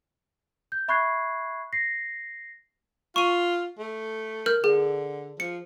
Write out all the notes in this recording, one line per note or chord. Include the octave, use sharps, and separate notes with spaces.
G6
E5 B5 C#6 F#6 G#6 C7
A#6 C7
F4 C#6 D#7
A3
A#4 F6 G6
D3 G#4
F3 C#7